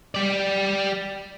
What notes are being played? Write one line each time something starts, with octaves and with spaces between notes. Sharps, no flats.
G3 D5